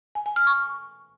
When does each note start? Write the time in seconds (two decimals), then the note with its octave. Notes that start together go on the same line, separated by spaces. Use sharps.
0.15 G#5
0.26 G#5
0.36 F6
0.47 C#6